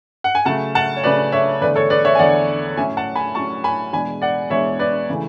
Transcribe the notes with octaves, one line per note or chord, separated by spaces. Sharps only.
F#5
G#5
C#3 F#3 A3 F#5 A5
F#5 A5
C#5
C#3 F#3 A3 B4 D5
C#5 E5
E2 D3 A3 D4 B4 D5
A4 C#5
B4 D5
C#5 E5
G#5
E2 D3 A3 D4 D5 F#5
A2 F#3 C#4 E5 G#5
F#5 A5
G#5 B5
A2 F#3 C#4 A5 C#6
G#5 B5
E2 B2 G#3 D4 G#5 B5
D5 F#5
E2 B2 G#3 D4 C#5 E5
B4 D5
C#3 E3 A3